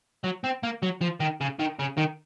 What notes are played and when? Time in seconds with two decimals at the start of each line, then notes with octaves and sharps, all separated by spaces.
0.24 F#3
0.44 C4
0.63 A#3
0.83 F#3
1.01 F3
1.20 D#3
1.41 C#3
1.59 D#3
1.79 C#3
1.97 D#3